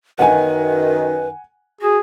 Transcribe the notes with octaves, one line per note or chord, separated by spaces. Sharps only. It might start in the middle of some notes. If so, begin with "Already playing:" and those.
F#2 D#3 B4 F#5 G#5
F#4 G#4